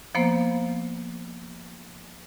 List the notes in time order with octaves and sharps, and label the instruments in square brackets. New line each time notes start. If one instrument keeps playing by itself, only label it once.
[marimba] F3 A#3 B3 C5